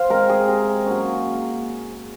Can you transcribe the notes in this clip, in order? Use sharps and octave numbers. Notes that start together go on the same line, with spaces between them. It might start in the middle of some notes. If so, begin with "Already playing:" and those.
Already playing: C5 F5
G#3 C4 A#4
G#4
C3
F#3 A#3 C#4